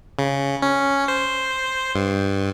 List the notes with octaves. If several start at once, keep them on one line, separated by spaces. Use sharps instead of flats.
C#3
C#4
C5
G2